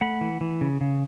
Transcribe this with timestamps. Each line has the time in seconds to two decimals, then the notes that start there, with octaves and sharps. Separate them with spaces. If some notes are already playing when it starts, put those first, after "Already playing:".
0.01 A3 F#5 B5
0.21 E3
0.41 E3
0.61 C#3
0.81 C#3